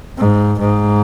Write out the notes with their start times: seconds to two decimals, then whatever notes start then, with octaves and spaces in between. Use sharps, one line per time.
0.18 G#2
0.59 G#2